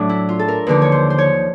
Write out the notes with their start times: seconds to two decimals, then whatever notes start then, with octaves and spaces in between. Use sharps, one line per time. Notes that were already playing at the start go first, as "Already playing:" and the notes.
Already playing: A2 F#3 D4
0.09 E4
0.29 F4
0.39 A4
0.48 A#4
0.67 D#2 D3 F3 B4
0.82 C#5
0.92 C5
1.10 C5
1.18 C#5